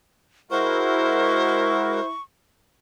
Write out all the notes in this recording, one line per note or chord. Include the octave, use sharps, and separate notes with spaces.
G#3 E4 F#4 A#4 C5 C#6